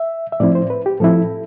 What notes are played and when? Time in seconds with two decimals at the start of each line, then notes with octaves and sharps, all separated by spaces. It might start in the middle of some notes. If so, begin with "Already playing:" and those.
Already playing: E5
0.32 E5
0.40 A2 F3 C4 E4 D5
0.55 C5
0.70 B4
0.86 G4
1.00 A2 F3 C4 E4 A4